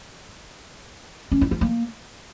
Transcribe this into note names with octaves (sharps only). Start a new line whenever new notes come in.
C#4
E4
F4
A#3